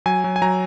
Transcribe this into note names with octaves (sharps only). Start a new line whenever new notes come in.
F#3 G#5
F#3
G#5
F#3 A#5